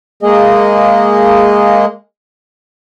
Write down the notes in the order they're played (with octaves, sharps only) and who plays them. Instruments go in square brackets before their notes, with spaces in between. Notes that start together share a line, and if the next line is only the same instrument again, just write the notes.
[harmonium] G#3 A#3 G#4 D#5